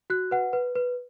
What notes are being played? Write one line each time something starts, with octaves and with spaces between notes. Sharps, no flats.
F#4 F#6
B4 F#5
B4
B4